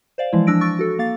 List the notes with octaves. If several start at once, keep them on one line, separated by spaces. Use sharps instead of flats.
C5 D5 F5
E3 F3 G#3 E4
F3 D4 E6 A#6 D7
C#6 E6 A6
F#4 A4
A#3 F5 A6